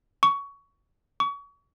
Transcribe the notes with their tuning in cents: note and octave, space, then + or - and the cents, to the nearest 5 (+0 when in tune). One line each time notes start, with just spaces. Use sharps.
C#6 +15
C#6 +30